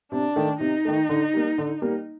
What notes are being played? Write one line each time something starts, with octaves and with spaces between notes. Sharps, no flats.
C3 D4
D#3 A3
C3 D#4
D#3 A3
D3
G3 A#3
D3
G3 A#3